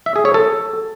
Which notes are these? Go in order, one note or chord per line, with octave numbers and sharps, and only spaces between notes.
E5
G#4
C#5
A4